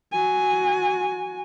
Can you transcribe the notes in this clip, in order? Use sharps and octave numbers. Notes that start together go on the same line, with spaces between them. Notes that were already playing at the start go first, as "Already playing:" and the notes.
F#4 G#5